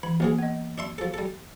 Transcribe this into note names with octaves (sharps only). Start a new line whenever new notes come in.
E3 B5
A#1 E3 A#3 G#4
B3 D#5
D4 E5 C6
F3 A4
G3 A4